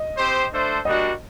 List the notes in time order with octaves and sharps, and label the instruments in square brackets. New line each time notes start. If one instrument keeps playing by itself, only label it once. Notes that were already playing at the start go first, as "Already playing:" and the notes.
Already playing: [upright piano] D#5
[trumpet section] C4 G4 C5
A3 D4 A4 C5
[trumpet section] G3 A#3 D4 F#4 [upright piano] D#5